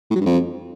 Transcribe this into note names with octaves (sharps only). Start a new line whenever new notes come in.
A2
F#3
G2
F2